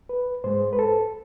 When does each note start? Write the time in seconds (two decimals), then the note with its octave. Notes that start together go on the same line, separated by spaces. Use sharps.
0.09 B4
0.44 G#2 G#3 C5
0.73 B4
0.79 A4